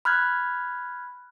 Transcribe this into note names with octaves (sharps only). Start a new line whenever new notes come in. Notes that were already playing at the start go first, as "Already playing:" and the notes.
B5 F6 F#6 G#6